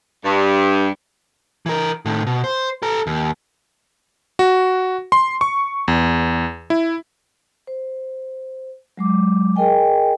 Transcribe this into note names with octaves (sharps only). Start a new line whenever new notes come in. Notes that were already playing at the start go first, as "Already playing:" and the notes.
G2
E3 A#4
A2 D#3
B2
C5
A4 A#5
D#2
F#4
C6
C#6
E2
E4
C5
F#3 G#3 D6
G#4 A#4 D#5 G5 G#5